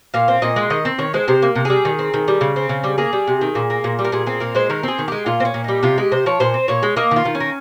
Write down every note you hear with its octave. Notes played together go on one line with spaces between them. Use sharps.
A#2 F5
C4
A#2 D#5
G#3
D#3 D#5
C4
D#3 C#5
G#3 C5
C3 C5
A#3
C3
G3 G#4
D#3
C4
D#3
G3
C#3
C4
C#3
G3
A#3 G#4
G3
C3
D#3
A#2
A#3
A#2
G3
A#4
A#2 G#4
C4 G#4
A#2 A#4
G#3 C5
D#3 A#4
C4 G#4
D#3
G#3 G4
A#2 F4
C4
C#4
A#2
G3 D#4
C3 F4
G#3 G4
C3 C5
F3 C#5
A#2 C5
C4
A#2 C#5
G#3
A#3 D#5
D#3 F4
D#3
C#4
A#3